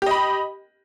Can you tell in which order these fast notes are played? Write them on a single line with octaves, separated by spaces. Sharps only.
G4 D#5 B5